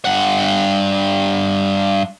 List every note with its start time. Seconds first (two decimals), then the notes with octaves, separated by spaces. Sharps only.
0.05 G2 F#5